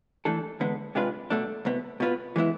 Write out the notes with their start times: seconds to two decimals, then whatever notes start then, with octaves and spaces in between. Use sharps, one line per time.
0.25 E3 A3 D4 A4
0.60 E2 D3 G#3 B3
0.95 C3 G#3 D4 F4 B4
1.30 B2 A3 D4
1.65 C2 B2 B3
2.00 B2 B3 F4 B4
2.36 E3 G#3 B3 E4